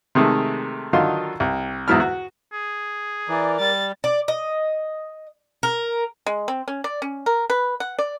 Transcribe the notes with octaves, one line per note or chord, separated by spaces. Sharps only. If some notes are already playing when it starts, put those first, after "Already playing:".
C3 D#3 G#3 A3
D3 D#3 F#3 D#4 F4 C6
C2
E2 G#2 F#3 E4 E6 F6
F#4
G#4
E3 A#4 D5
G3 A6
D5
D#5
A#4
G#3
C4
C#4
D5
C#4
A#4
B4
F#5
D5